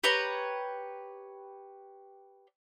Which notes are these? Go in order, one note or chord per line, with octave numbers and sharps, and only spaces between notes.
G4 B4 C#5 A#5